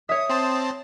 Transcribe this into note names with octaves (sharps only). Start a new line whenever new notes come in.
C#5 E5 D#6
C4 C5 A5